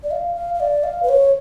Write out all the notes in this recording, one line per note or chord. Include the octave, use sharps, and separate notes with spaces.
D5
F5
F5
F5
D5
F5
B4
C#5